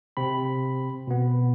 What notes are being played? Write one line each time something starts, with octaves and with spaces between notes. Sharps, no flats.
C3 C4 B5
B2 B3